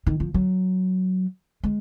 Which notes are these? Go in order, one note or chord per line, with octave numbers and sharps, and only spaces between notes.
D#3
F3
F#3
G#3